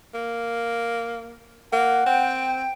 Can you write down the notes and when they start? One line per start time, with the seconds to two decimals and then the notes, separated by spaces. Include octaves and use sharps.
0.14 A#3
1.73 A#3 F#5
2.06 C4 G5